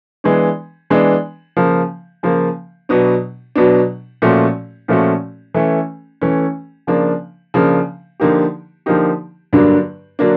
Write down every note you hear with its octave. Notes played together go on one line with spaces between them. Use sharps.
E3 G#3 B3 D4
E3 G#3 B3 D4
C#3 F3 A#3
C#3 F3 A#3
B2 F#3 B3 D4
B2 F#3 B3 D4
A#2 F3 A3 C#4 F#4
A#2 F3 A3 C#4 F#4
E3 A3 C#4
E3 A3 C#4
C#3 F3 A#3 D4
C#3 F3 A#3 D4
D3 F3 A#3 D#4 G4
D3 F3 A#3 D#4 G4
G2 D3 F#3 A#3 D4
D3 F#3 A#3 D4